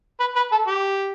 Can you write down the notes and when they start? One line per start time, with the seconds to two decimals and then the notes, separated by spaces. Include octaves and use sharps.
0.20 B4
0.36 B4
0.52 A4
0.67 G4